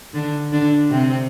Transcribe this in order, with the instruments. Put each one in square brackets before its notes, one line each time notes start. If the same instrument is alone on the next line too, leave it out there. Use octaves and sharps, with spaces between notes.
[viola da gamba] D3 D4
D3 D4
C3 C4